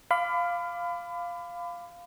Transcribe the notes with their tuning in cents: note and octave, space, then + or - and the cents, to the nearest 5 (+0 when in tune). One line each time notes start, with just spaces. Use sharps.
F5 +0 B5 +35 D6 +5